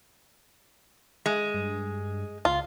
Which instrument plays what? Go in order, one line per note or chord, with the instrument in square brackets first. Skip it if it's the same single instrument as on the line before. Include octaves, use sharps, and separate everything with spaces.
[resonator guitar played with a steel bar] G#3
[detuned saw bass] G2
[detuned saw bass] C#2 [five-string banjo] F4